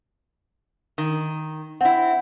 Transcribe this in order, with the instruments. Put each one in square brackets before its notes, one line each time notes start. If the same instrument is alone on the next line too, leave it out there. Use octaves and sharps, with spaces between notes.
[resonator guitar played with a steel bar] D#3
[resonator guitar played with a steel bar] C4 E4 [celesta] F#5